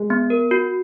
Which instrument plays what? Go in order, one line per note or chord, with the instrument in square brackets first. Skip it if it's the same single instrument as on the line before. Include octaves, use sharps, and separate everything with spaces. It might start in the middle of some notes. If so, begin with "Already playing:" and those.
Already playing: [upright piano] G#3
[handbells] B3
A#4
F#4